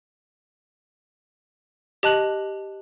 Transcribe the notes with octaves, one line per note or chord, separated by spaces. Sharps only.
G4 D#5 A5 F#6 F#7